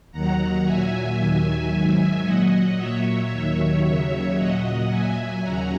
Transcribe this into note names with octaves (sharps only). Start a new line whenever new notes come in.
D#2 D#3 F#3 F#5 A#5
A#2 F#3 E5 G#5
D#2 D#3 F#3
G#2 D#3 F#3 E5 G#5
A#2 F#3 D#5 F#5
A#2 F#3 C#5 E5
D#2 D#3 F#3 C#5 E5
D#2 C#3 F#3
A#2 F#3 D#5 F#5
A#2 F#3 E5 G#5
D#2 C#3 F#3 F#5 A#5